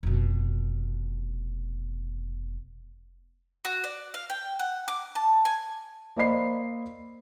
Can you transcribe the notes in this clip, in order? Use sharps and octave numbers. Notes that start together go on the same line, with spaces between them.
F1 B2
F#4
D5
F5
G5
F#5
D6
A5
G#5
A#3 C5 D5 D#5 B5 C7